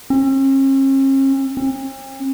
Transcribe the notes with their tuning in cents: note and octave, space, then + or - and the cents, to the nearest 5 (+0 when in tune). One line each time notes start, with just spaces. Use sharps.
C#4 -45
C4 +45